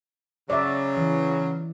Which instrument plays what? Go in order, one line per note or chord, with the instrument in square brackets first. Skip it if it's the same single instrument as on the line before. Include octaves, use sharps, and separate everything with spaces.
[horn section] C#3 F#3 [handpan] D5 E5
[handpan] E3